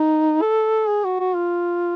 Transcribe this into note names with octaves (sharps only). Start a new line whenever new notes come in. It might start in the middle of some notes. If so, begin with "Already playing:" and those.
Already playing: D#4
A4
G#4
F#4
F#4
F4